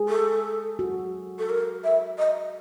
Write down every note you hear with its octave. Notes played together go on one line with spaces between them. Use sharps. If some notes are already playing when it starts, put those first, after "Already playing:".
Already playing: G#4
A4
F#4
A4
A#4
E5
D#5